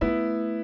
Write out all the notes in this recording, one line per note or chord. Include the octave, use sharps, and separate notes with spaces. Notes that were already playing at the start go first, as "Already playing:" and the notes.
A3 B3 E4